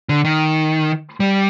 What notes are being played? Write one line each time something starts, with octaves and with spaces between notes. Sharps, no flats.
D3
D#3
G3